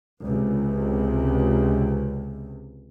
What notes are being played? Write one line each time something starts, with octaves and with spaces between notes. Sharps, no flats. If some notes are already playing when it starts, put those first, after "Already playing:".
C#2 C3